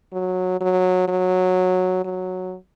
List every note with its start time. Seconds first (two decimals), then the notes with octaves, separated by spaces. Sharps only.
0.13 F#3
0.61 F#3
1.08 F#3
2.05 F#3